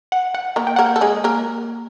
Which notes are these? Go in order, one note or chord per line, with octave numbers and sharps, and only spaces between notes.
F#5
F#5
A#3 A#4
G5
A#3 A#4 F#5
G5
A4
G#3 G#4
A#3 A#4